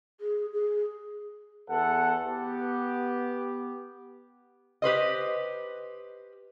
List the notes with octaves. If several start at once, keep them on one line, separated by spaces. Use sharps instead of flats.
G#4
G#4
E2 A4 F#5
B3 G4
G4 B4 C5 D#5